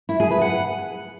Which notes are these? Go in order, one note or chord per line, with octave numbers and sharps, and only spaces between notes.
E4
G#4
B4
F#5